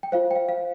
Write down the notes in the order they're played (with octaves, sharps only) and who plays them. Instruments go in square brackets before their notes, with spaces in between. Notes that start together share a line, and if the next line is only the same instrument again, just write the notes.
[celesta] G5
F4 C5 F5
G5
F5
F5